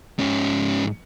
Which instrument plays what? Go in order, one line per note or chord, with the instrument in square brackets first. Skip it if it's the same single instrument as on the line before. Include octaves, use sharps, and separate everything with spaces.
[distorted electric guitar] G#2 C#4